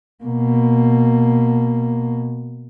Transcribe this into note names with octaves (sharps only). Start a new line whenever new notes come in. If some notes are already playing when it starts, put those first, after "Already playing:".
B2 A#3